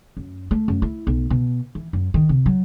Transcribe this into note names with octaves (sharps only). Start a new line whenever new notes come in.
F#2
A3
F#2
E4
B1
B2
E3
F#2
D#3
C3
F#3